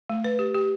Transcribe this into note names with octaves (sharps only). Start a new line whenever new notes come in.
A3
B4
G4
G4